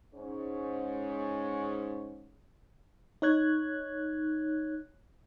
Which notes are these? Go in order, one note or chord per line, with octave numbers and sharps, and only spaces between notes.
G#2 C#4
D#4 C#5 F#6 G#6